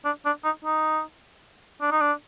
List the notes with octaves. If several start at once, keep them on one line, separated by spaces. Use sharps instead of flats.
D4
D4
D#4
D#4
D4
D#4
D4